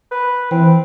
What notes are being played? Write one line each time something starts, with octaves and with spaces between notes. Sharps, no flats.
B4
E3 C4